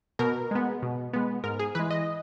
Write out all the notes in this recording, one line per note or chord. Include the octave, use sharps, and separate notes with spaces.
B2 A#4
G#3 B3
B2
G#3 B3
G#2 A#4
G#4
E3 G#3 B4
D#5